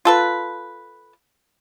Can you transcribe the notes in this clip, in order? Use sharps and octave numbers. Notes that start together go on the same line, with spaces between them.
F4 A4 B4